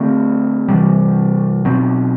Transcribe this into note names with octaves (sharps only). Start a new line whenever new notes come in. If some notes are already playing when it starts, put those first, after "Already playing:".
Already playing: D3 A3 C4
C3 E3 G3
B2 F#3 C4